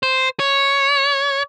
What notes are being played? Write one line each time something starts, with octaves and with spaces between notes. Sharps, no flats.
C5
C#5